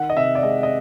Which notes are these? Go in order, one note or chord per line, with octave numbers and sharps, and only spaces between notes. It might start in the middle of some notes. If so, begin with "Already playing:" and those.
Already playing: D#3 F#5
D#5
C3 E5
D5
G#3 D#5
D#5